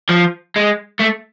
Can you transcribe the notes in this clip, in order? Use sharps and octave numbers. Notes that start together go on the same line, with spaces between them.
F3
G#3
A3